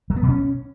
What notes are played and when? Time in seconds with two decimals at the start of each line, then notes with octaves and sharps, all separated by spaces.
0.10 F#3
0.16 B3
0.23 B2
0.29 C#4